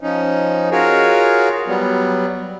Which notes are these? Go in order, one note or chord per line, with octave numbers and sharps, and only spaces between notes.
F3 C#4 D#4
F4 F#4 G#4 A#4 C#5
F#3 G3 B3